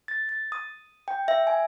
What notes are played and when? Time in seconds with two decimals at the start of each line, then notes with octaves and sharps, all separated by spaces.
0.08 A6
0.29 A6
0.52 D#6
1.08 G5
1.28 E5
1.47 G#5